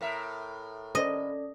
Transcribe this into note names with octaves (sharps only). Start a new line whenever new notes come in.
A2 A#4 E5
C#4 A4 D5 D#5